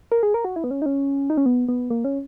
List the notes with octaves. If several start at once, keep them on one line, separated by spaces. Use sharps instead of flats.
A#4
G#4
A#4
F#4
E4
B3
C#4
D#4
C#4
D#4
C#4
B3
B3
A#3
C#4